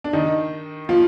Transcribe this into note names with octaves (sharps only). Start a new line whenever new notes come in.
D4
D#3 D#4
F3 F4